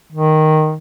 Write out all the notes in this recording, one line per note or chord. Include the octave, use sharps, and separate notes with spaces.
D#3